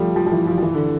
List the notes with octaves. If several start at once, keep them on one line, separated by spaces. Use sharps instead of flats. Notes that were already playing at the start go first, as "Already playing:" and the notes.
Already playing: F3 G3 A3
F3
F3
E3
F3
F3
E3
D3